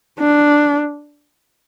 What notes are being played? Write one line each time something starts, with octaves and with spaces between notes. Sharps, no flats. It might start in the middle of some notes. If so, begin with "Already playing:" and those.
D4